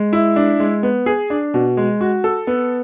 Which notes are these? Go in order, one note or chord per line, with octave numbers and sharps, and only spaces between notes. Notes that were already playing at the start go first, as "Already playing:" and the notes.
Already playing: G#3
E4
D4
G#3
B3
G#4
D4
B2
G#3
F#4
A4
B3